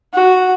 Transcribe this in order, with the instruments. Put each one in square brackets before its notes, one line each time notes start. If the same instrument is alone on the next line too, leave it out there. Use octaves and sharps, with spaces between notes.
[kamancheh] F#4